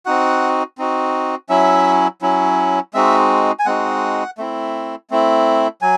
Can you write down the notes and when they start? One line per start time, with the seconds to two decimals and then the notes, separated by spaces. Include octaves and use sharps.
0.06 C4 D#4 F#4 F#5
0.78 C4 D#4 F#4
1.49 F#3 C#4 E4 E5
2.22 F#3 C#4 E4
2.94 G#3 C4 D#4 F#4 E5
3.59 G#5
3.66 G#3 C4 D#4 F#4 F#5
4.38 A3 C4 E4
5.10 A3 C4 E4
5.82 F#3 G#5